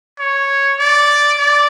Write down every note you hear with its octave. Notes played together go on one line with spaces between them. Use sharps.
C#5
D5
D5